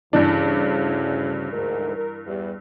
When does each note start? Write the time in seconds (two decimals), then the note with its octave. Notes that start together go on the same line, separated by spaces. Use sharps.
0.13 D2 G2 C#3 E3 D4
1.52 D2 G#2 A#4
1.95 A#4
2.26 E2 G3